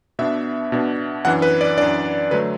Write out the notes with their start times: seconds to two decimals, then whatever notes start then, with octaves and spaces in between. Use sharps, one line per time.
0.19 B2 B3 D4 E5
0.72 B2 B3 D4
1.25 F#2 E3 D4 F#5
1.42 B4
1.61 D5
1.78 F#2 E3 D4 D5
2.31 D3 F#3 A3 B4